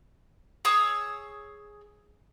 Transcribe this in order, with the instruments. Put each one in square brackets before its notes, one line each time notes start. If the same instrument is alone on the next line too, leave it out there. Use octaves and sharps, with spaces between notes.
[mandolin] G#4 C#5 D#6 E6